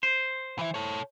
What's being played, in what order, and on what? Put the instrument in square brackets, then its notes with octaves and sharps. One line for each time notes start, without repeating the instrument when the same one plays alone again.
[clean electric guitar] C5
[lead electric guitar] E3 E4
A4 C#5